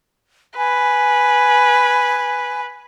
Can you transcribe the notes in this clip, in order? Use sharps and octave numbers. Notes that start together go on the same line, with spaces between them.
B4 G#5